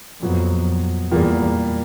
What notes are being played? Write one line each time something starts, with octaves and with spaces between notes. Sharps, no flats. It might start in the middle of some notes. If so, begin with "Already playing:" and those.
F2 A#2 F#3 B3
E2 A#2 G3 A#3